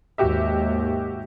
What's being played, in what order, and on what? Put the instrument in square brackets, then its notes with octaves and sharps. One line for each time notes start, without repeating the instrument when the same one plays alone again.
[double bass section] D#2 G#2 [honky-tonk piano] F#4 G4 E5